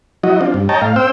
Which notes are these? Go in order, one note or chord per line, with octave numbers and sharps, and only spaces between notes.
F#3 E4 F#4 D#5
C4 D4 F4
G2
C#5 D#5 G5 A5 A#5
A2 F5
C4 C5 G5 E6